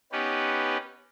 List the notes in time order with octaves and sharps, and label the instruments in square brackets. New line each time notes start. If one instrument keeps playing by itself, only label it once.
[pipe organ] B3 C#4 D#4 G4 B4